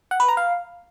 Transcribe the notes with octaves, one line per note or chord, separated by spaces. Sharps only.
F#5
B4
A#5
F5